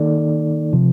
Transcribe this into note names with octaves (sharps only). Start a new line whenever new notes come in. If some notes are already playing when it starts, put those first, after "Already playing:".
Already playing: D#3 A#3 D#4 A4 D5
C3 F3